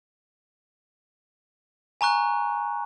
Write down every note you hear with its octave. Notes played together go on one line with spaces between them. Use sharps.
G#5 A#5 C#6 F#6